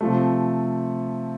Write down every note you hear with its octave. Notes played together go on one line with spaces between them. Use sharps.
C3 F3 A3